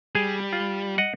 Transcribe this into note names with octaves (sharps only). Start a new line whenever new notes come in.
G3 G#4
F4
D#5 F#5